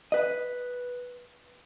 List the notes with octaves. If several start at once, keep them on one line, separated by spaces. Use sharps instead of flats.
B4 D#5